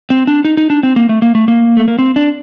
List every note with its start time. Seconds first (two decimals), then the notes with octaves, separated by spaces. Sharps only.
0.10 C4
0.27 D4
0.45 D#4
0.57 D#4
0.70 D4
0.83 C4
0.96 A#3
1.09 A3
1.22 A#3
1.35 A3
1.48 A#3
1.77 A3
1.88 A#3
1.99 C4
2.16 D4